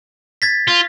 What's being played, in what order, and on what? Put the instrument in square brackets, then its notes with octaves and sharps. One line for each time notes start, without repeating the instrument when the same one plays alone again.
[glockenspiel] G#6 A6 B6
[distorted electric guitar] F4